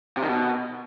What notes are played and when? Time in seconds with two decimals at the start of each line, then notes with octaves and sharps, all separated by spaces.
0.17 C3
0.22 D#3
0.28 B2